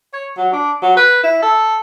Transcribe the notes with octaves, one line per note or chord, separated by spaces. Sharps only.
C#5
F#3
D4
F#3
B4
E4
A4